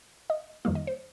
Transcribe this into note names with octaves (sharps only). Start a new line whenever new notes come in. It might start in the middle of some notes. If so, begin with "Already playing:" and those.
D#5
F2 D#3 G3 A#3 D#4 F5
D#5
C5